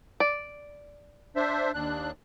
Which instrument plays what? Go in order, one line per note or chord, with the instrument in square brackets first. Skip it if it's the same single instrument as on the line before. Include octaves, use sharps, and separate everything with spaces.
[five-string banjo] D5
[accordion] D4 C5 E5
D#2 D4 F#6